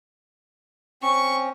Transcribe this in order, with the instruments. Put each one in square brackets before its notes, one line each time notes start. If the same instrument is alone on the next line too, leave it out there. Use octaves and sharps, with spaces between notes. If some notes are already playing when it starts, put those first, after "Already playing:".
[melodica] C4 C#4 [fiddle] C#6